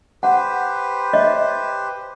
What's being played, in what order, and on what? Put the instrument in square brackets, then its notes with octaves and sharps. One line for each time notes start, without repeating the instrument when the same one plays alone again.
[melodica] G4 B4 C5 [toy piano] F#5
[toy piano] C#5 D#5 E5